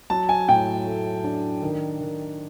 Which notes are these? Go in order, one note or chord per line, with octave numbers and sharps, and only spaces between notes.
F#3 A5
G#5
A2 G5
A3
D4
D#3
D#3